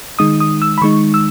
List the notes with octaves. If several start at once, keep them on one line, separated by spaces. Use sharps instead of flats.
D#3 G#3 D#4 D#6
D#6
E6
B5
D#3 G#3 D#4 C#6
E6